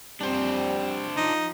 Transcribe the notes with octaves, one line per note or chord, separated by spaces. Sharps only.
F2 G3 C4 D4 C5
F3 D#4